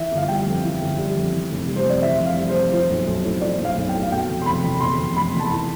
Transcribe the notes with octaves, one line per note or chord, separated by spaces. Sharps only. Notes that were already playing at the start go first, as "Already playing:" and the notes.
Already playing: E3 E5
G1
F5
G3 G5
F2
E3
G1
G3
F2
E3
F1
G3
C5
F2 D5
E3 E5
F1
F5
G3
C5
F2
F3 C5
B1
B1
A2
F3 D5
B1
F5
B1
A2 G5
F5
B2 G5
F1
C6
F1 B5
E2
B2 C6
F1
F1 B5
E2
A5
E3 B5